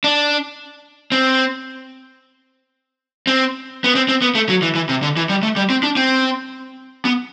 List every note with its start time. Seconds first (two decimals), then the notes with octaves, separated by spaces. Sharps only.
0.04 D4
1.12 C4
3.27 C4
3.84 B3
3.95 C4
4.09 C4
4.22 B3
4.35 A3
4.49 F#3
4.62 E3
4.75 E3
4.89 C3
5.03 D3
5.17 E3
5.29 G3
5.43 A3
5.56 G3
5.70 C4
5.83 D4
5.97 C4
7.05 B3